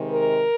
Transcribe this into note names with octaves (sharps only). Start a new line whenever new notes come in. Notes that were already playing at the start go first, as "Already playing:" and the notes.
Already playing: C3 D#3 G#3
A#4